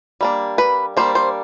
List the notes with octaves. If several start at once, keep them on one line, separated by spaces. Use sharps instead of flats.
G3 A#3 D4
B4
G3 A#3 D4 C5
C5